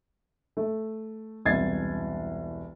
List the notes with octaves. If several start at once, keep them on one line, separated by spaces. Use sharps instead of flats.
A3
E1 C2 G#6 A6 C7